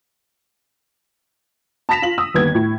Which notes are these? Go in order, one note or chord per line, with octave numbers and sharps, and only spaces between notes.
A5 B5 A#6 B6 E7 F7
F4 F#7
D#6 E6
G1 D#2 B3 G#6
A2